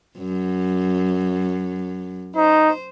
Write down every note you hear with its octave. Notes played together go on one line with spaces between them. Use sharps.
F#2
D#4 C5